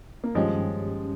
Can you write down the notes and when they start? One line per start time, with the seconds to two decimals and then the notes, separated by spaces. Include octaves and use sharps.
0.24 A#3
0.35 G2 D#3 F3 G3 G#3 C#4 G4